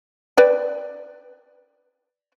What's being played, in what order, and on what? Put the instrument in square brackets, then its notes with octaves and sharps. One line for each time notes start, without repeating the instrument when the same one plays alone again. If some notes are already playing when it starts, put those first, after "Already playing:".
[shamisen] B4 D5 G5